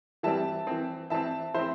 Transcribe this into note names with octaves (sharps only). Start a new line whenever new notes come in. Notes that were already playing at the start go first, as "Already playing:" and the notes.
E3 G3 C4 E5 A5
E3 C4
E3 C4 E5 A5
E3 C4 C5 E5